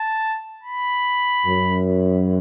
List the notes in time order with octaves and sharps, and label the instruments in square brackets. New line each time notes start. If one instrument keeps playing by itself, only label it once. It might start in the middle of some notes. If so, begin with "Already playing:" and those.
Already playing: [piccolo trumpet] A5
B5
[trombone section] F#2